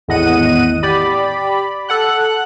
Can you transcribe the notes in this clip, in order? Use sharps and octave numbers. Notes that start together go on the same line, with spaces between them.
G#1 E2 A2 D#5 F#5 D#7
G4 D5 B5
A4 F#5 F#6